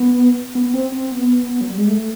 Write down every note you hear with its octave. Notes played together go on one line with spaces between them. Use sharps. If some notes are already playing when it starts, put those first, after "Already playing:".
Already playing: B3
B3
C4
C4
B3
B3
F#3
G3
G#3
A3